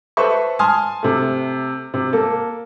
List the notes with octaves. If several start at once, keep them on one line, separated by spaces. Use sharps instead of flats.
A4 B4 C5 E5 C#6
G#5 A5 C6 D#6 F6
C3 A3
C3
A#3 A4